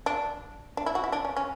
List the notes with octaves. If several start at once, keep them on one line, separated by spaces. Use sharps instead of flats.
D4
D4
E4
F#4
E4
D4
C#4
C#4